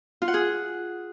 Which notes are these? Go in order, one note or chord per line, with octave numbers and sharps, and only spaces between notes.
F4
F#5
G#4